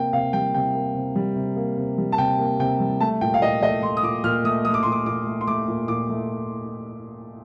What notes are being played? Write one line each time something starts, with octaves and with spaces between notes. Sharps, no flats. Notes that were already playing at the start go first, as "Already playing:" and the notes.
Already playing: C3 A#3 G5
C3 F5
G3 G5
C3 G5
A#3
C3
G3
C3
A#3
C3
G3
A5
C3 G5
A#3
C3 G5
G3
A3 A5
A#2 G5
F5
A#2 D#5
A3 D#5
A3 C6
D#6
A#2 D6
A#2 F6
A3 D#6
A3 D#6
D6
A#2 C6
D6
A#2 D6
A3
C6
A3 D6
A#2
A#2 D6
A3